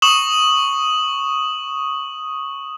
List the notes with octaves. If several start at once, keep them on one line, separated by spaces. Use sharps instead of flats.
C#6 D#6 E7 F#7